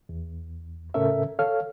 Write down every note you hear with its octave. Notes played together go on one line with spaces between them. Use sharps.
E2
A2 C#3 C#4 A4 A#4 E5
A4 C#5 F5 F6